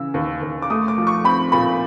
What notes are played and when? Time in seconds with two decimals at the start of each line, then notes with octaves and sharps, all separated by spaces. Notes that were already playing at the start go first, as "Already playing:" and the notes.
Already playing: C#3 E3 E6
0.14 D#2
0.42 D#2
0.62 D6
0.70 A3 D#6
0.88 D6
0.98 F3
1.07 C#6
1.24 C4 B5
1.52 A#2 B5